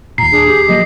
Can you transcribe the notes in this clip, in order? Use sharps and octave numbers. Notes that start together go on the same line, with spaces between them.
D#2 A#2 A#5 C7
D4 G#4
G4
F3 F#3 A#3 D#5